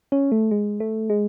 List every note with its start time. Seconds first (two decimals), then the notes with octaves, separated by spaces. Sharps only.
0.12 C#4
0.32 A3
0.51 G#3
0.80 A3
1.10 G#3